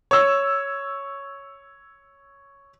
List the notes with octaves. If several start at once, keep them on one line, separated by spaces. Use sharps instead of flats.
C#5 E6